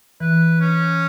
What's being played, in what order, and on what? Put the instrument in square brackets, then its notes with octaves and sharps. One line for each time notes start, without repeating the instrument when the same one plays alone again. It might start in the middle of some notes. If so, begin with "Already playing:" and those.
[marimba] E3 [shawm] B4
[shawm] C#4